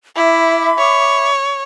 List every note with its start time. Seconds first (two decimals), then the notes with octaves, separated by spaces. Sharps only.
0.16 E4 E5 B5 D6
0.78 C#5